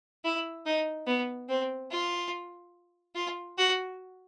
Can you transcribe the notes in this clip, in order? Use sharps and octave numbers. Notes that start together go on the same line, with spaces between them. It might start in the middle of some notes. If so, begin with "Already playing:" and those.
E4
D#4
B3
C4
F4
F4
F#4